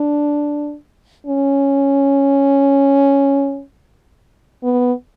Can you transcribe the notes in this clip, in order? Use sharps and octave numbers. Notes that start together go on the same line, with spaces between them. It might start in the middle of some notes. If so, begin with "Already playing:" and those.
Already playing: D4
C#4
B3